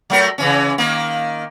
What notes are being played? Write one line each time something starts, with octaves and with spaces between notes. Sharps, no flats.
F#3 A3 A#4
C#3 E3 C#4
D#3 A#3